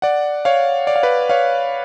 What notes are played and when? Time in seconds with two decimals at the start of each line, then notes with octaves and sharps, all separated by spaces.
0.02 D5 F#5
0.45 C#5 F5
0.87 D5
0.96 F5
1.03 B4 D5
1.30 C#5 F5